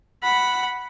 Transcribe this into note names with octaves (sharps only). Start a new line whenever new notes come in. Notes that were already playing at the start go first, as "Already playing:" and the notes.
F#5 B5